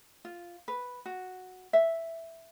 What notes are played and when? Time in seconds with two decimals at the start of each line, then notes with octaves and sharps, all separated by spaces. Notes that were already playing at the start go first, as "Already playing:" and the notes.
0.25 F4
0.68 B4
1.06 F#4
1.73 E5